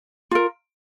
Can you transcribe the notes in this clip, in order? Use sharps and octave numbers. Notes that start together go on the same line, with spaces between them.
F4 A#4